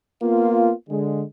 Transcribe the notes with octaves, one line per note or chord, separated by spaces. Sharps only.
A#3 B3 F4
D3 G#3